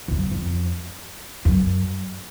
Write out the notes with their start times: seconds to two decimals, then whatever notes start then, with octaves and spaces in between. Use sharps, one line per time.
0.08 F2
0.12 F#2
0.31 F2
1.45 F#2